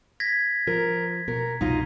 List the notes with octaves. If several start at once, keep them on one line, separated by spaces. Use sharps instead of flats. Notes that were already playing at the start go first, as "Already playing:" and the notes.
G#6 A#6 B6
F3 A#4
B2 A#4
C2 F2 B2 D#4 F4 D#5